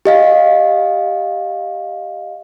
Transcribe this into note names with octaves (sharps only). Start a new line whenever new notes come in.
G4 D#5 F5